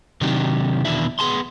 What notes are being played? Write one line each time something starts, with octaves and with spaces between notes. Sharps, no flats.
C3 D#3 F#3 D4 D#4 G4
E2 B2 D#3 D4 E4 E5
B3 G#4 A5 C6